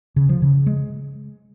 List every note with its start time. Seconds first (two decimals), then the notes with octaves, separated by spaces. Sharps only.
0.16 C#3
0.29 F3
0.42 C#3
0.66 G#3